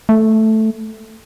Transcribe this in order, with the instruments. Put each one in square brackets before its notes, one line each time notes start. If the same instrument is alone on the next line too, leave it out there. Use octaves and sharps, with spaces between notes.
[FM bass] A3